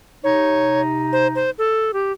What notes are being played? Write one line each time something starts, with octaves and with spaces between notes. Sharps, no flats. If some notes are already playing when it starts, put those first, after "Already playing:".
C3 D#4 C#5
C5
C5
A4
G4